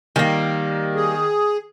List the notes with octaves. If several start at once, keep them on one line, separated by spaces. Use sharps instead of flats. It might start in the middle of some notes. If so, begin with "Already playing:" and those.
D#3 G3 A#3
G#4